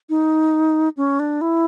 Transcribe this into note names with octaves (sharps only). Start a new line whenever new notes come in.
D#4
C#4
D4
E4